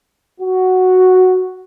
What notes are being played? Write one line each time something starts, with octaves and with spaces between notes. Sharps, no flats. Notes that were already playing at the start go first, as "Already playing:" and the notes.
F#4